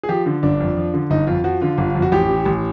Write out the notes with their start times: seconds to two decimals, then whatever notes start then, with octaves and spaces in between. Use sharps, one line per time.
0.03 G#4
0.09 F3 G4
0.26 D3
0.43 G1 D4
0.60 F2
0.77 F3
0.94 D3
1.10 G1 D#4
1.27 F2 F4
1.44 F3 F#4
1.61 D3 F4
1.78 G1
1.95 F2
2.02 F#4
2.12 A1 G4
2.29 E3
2.45 A1